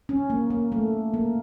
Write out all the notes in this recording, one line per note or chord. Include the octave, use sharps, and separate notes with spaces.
C#4
A#3
A#3
A3
A#3